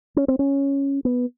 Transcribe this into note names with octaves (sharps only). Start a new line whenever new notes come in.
C#4
C4
C#4
B3